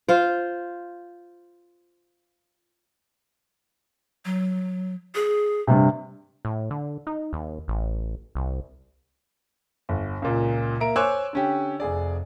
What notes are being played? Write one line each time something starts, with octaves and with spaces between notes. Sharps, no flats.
F4 C5
F#3
G#4
G2 C3
A2
D3
D#4
D#2
A1
C2
G1
C#2 A#2
A#3 E5 A#5 D7
C5 C#5 G#5 D6 E6 F#6
D3 C#4 G4
F1 G#4 D5